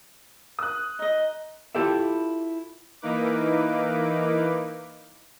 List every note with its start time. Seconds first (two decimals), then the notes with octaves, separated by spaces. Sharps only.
0.59 D#6 F#6
0.99 D#4 D#5
1.75 E4 F4 G4 A4 D5 E5
3.02 E3 A#3 D#4 B4 D6